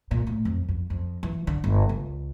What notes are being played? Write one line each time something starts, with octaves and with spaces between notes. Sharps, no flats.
A#2
A2
F2
F2
F2
E3
D3
G1
C#2